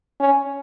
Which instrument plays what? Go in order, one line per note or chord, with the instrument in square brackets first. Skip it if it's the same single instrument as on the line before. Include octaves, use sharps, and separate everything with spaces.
[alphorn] C#4